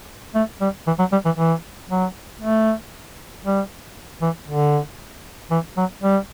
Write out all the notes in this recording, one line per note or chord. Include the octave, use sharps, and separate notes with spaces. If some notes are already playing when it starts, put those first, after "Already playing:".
A3
G3
E3
F#3
G3
E3
E3
F#3
A3
G3
E3
D3
E3
F#3
G3